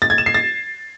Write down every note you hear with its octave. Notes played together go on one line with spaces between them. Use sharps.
A6
G#6
E7
C7
A6